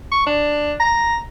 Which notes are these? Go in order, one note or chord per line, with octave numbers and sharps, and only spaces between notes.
C#6
D4
A#5